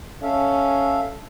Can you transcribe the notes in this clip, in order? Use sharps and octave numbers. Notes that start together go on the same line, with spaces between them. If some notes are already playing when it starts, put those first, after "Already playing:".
C#4 A4 E5 F5